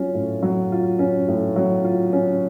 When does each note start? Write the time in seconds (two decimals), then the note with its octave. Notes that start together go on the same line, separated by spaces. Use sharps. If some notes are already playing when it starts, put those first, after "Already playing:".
Already playing: F#3 C#4 F4
0.14 A2
0.42 F#3
0.72 F4
0.99 C#4
1.28 A2
1.56 F#3
1.84 F4
2.13 C#4